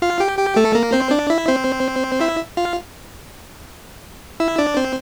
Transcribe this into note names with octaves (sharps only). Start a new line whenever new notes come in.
F4 F5
G4 G5
G4 G5
A3 A4
A#3 A#4
C4 C5
D4 D5
E4 E5
C4 C5
E4 E5
F4 F5
E4 E5
D4 D5
C4 C5